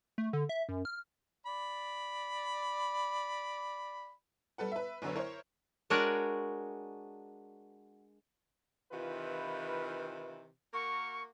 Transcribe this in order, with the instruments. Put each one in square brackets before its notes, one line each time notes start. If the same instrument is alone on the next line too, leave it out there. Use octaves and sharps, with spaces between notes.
[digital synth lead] A3
D3
E5
F#2
F6
[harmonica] D5 B5
[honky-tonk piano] G3 A4 B4 F#5
B4 E5
B1 F#2 D3 B3 C#5
E4 A#4 C5 C#5
[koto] G#3 D4 F#4 A#4 C#5 D5
[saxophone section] C3 D#3 E3 [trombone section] F4 B4
[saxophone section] A#3 F#4 A#4 [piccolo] C#6